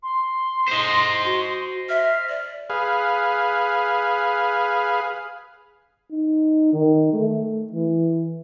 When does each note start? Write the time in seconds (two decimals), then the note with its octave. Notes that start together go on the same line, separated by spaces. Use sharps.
0.03 C6
0.68 C5 D#5
1.24 F#4
1.89 E5 F6
2.29 D5
2.70 G#4 B4 F5
6.11 D#4
6.73 D#3
7.13 A3
7.73 E3